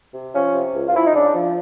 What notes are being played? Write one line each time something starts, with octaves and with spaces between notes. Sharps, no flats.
C3
F3 C#4
C3
C#2
F4
F3 E4
D#4
C#3 D4
F3